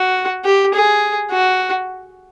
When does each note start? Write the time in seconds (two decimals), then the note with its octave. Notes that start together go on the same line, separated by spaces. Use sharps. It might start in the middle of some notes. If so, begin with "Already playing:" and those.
Already playing: F#4
0.45 G4
0.74 G#4
1.31 F#4